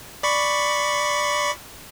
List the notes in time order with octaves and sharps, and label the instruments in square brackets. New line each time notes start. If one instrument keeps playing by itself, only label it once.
[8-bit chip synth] D5 B5 C#6